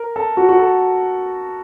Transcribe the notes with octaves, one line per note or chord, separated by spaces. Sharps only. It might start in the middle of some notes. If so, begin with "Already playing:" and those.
Already playing: A#4
A4
F#4
F#4
A4